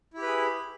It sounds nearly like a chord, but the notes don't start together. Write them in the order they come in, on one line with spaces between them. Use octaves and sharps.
E4 G4 B4 G#4